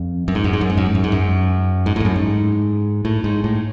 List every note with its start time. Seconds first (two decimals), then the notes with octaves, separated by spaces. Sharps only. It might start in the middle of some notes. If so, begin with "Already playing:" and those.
Already playing: F2
0.28 F#2
0.35 G#2
0.44 F#2
0.53 G#2
0.61 F#2
0.70 G#2
0.77 F#2
0.86 G#2
0.95 F#2
1.04 G#2
1.12 F#2
1.86 G#2
1.96 F2 A2
2.05 F#2
2.16 G#2
3.05 A2
3.24 G#2
3.44 A2